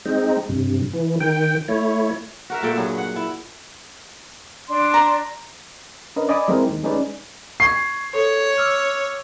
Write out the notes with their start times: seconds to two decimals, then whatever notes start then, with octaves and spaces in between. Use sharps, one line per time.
0.05 G#3 C4 D#4
0.49 G2 C3
0.93 E3
1.20 D#3 G5
1.68 A3 E4 C#5
2.50 F#4 A#4 E5
2.63 A#2 A3 A4 G5
2.76 G2 F#3 G#4
2.98 F#5
3.16 E4
4.68 D4 C6
4.94 A#5
6.16 C#4 D4 A#4 B4 D#5
6.29 D5 D#5 G#5 B5 D6 D#6
6.48 G3 G#3 C4 E4 A#4 C5
6.66 D#2 D#4
6.83 G#3 C#4 D#4 G#4 B4 D5
7.60 C#6 G#6 C7
8.14 A4 C#5
8.58 D6 E6 F6